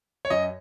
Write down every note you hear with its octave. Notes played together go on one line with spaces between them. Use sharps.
C#5
F#2 D#5